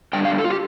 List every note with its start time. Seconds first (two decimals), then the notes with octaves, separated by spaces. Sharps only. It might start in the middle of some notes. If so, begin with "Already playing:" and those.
0.13 D3 G3 D4 G5
0.25 F5
0.38 A4
0.44 F4
0.50 G4